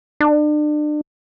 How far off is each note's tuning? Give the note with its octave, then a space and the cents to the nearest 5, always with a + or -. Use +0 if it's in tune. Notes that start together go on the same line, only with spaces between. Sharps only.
D4 +35